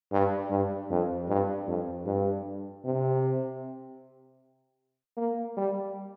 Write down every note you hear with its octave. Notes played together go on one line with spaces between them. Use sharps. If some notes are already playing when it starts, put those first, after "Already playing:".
G2
G2
F2
G2
F2
G2
C3
A#3
G3